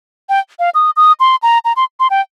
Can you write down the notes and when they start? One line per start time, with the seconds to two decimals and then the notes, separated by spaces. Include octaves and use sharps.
0.29 G5
0.59 F5
0.75 D#6
0.96 D#6
1.20 C6
1.43 A#5
1.65 A#5
1.77 C6
2.00 C6
2.10 G5